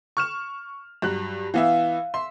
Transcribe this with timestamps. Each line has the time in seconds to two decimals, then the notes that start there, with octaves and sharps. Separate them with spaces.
0.17 C#6 F6 E7
1.02 G2 F#3 F#6
1.54 E3 B3 E5 F5
2.14 E5 C6